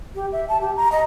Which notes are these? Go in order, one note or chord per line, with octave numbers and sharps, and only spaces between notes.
G4
E5
A5
G4
A#5
D#5